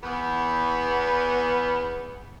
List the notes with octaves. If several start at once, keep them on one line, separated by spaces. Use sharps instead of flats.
E2 B3